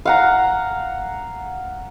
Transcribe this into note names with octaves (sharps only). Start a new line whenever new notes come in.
F5 F#5 A#5